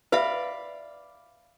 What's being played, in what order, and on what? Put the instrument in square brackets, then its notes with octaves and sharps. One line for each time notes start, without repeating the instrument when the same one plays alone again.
[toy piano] B4 E5 [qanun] D5 F5 B5